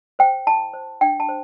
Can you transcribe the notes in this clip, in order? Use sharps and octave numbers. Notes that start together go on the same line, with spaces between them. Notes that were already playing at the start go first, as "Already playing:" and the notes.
C5 G5
E4 A5
C5
D4 G5
A5
C5